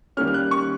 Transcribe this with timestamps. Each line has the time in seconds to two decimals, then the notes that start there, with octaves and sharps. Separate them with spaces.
0.17 D#3 G3 A#3 C#4 F6
0.28 F6
0.34 F#6
0.51 C#6